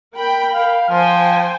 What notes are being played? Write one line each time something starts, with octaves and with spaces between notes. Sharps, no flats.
A#4 G5 B5
F5
F3 C5 G5 G#5